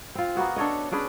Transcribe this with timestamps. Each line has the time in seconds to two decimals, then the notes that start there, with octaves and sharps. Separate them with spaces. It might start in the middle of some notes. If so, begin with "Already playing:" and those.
0.15 C4 F4
0.35 A#3 B3 F#4 G#4
0.56 D4 A4 C#5 D#5
0.91 C#4 D4 G#4 B4